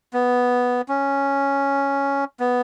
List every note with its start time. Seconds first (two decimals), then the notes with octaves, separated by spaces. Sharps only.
0.14 B3
0.89 C#4
2.40 B3